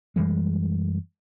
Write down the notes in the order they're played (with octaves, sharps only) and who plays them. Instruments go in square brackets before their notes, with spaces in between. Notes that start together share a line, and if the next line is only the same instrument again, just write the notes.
[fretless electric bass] F#2 E3 G3 G#3